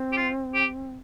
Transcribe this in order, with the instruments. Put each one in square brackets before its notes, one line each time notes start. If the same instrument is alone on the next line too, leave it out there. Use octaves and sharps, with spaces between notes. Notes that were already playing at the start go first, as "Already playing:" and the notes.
Already playing: [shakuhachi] C4
[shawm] G4
F4
G4